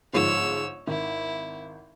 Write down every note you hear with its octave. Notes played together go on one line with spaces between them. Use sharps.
G1 G#2 F3 C#5 E6
G#1 E4